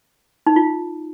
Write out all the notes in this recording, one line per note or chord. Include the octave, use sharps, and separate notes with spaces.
D#4
F4